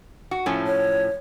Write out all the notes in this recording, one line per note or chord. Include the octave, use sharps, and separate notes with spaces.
F#4
A2 F3 C#4
C#5